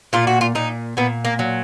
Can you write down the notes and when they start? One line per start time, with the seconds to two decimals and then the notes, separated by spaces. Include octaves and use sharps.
0.13 A#2 F4
0.27 F#4
0.41 F4
0.55 A#2 D#4
0.97 A#2 B3
1.25 A#3
1.39 F#3